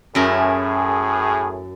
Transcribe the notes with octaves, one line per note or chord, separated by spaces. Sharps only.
F#2 A2 E4 G#4 A#4